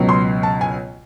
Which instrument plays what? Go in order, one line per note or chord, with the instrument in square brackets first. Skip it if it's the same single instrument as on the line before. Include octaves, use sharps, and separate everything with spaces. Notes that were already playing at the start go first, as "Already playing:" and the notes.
Already playing: [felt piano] C#2 B2 F#3
C6
A5
G#5